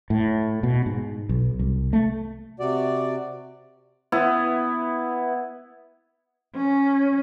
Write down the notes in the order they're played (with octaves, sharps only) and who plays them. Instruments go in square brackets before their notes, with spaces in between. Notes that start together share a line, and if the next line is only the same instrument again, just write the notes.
[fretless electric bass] A2
B2
G#2
B1
C2
A3
[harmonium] C3 F#4 D5
[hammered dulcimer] B3 E4
[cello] C#4